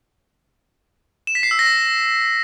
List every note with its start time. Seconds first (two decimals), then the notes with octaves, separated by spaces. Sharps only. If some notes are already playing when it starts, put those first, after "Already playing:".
1.27 E7
1.35 B6
1.43 C7
1.51 E6
1.59 A#6